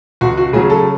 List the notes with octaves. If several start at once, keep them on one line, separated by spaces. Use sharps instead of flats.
C#2 F#4
F#4
C#3 F#3 G#4
A4